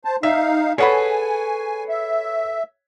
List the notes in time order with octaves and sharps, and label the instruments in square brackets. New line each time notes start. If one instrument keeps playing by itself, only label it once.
[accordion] C5 A5
[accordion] D#4 F5 [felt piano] E5
[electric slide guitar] G#4 A4 B4 [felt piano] C#5 F#5 B5 [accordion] G#5
[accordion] E5